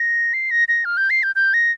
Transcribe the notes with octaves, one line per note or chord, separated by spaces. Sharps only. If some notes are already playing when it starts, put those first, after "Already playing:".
Already playing: A#6
C7
A#6
A#6
F6
G6
C7
G6
G6
A#6